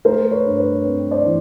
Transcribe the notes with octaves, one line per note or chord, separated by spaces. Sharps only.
A3 A#4 C5
B4 C#5
G2
B4 C#5
C4
C5 D5
E3